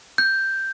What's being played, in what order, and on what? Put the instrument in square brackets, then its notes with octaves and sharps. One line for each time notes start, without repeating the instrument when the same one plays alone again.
[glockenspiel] G6